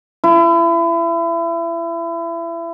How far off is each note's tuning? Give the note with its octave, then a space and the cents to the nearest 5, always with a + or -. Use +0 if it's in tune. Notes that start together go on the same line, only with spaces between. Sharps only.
E4 +30